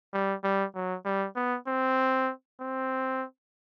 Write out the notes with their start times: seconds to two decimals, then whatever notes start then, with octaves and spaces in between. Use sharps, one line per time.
0.13 G3
0.44 G3
0.75 F#3
1.05 G3
1.36 B3
1.67 C4
2.60 C4